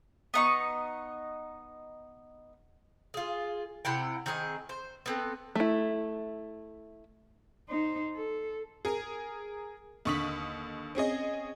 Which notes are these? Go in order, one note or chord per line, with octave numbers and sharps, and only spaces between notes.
B3 D#4 C#6
F4 G#4
C3 E4 F#5 G5
D#3 C4 G#4 D#5
C5
B3 C4 A4
A3 E4
D#4 C5
A4
G#4 A#4
D#2 D3 C#6 D#6 B6 F#7
C4 C#4 G#4 D#5